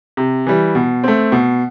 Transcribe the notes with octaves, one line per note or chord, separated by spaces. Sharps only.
C3
E3 G3
B2
A3 C4
B2